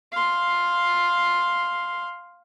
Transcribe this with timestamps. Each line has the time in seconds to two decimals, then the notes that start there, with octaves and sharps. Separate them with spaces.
0.12 F5 C6